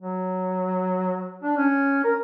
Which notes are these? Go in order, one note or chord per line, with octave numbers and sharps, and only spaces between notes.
F#3
D4
C#4
A#4